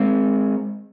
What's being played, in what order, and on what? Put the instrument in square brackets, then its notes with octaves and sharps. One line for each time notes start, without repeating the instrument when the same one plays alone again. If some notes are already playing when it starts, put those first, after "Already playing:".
Already playing: [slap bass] G#3 C4